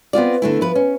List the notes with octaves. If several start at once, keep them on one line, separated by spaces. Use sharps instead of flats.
B3 C4 F4 D5
D3 A3 E4
F3 B4
C#4